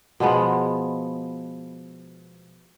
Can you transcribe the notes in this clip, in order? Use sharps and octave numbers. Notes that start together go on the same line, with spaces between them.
B2 F3 G#3 B3